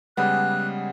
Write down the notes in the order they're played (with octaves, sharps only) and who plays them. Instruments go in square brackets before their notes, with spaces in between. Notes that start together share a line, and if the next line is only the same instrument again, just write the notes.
[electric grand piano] C#3 G3 G#3 [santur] B3 [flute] F#6